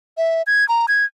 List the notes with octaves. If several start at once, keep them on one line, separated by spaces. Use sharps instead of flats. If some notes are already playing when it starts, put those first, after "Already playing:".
E5
G#6
A#5
G#6